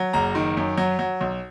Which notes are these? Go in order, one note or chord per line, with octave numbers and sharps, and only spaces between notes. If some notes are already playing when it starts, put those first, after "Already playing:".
Already playing: F#3
F#1 A#5
D#3
F#2
F#3
F#3
B1